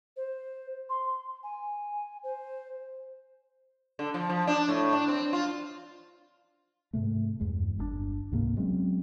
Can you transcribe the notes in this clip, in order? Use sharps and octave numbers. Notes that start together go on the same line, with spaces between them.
C5
C6
G#5
C5
D3
F3
F3
D4
A2
D4
C4
F4
G#2 C3 A3
E2 G2 G#3
G1 C#3 D4
C#2 G#2 C3 A#3
F#3 G#3 C4 C#4